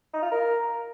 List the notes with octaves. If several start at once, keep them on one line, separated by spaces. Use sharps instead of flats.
D#4
F4
A#4